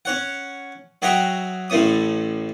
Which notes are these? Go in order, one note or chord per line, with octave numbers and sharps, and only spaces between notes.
C#4 C#5 F#5
F#3 F#4 G#4 E5 G5 A#5
A1 A2 A3 C#4 D#6